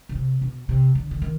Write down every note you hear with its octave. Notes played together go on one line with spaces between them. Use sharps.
B2
C3
B2
C3
D3
D3
D#3